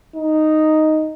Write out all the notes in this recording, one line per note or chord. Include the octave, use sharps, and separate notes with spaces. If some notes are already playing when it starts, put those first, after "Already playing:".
D#4